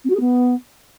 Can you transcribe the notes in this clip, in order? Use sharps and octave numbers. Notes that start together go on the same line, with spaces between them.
C4
F#4
G#4
B3